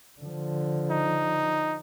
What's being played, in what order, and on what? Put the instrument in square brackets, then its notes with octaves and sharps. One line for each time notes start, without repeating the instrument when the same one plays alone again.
[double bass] D3 F3
[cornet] D#4